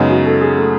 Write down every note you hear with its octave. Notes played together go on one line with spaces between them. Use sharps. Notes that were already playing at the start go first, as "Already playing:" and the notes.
Already playing: F#2 C#3 F#3 G#3 B3 D#4
F#4
A4
G#4
A3